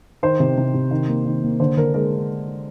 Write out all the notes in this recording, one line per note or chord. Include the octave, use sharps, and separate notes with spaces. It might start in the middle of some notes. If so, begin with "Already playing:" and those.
D#3 C5
C3
C3
C3
D#3
A#3
D#3
A#3
D3 C5
D3 A#4
G#3 A#4